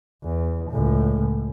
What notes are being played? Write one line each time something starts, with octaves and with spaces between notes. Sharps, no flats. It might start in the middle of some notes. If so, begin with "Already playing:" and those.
E2
C#2 A2